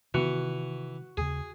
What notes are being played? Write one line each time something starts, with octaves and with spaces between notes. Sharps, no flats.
C3 D#3 E3 B3 F#4
D#2 C#3 G#4